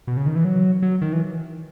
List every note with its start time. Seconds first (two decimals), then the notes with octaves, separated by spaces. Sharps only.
0.07 B2
0.17 C#3
0.26 D#3
0.36 E3
0.45 F#3
0.82 F#3
1.02 D#3
1.13 E3